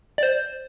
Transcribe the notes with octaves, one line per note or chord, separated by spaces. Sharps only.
D5
C5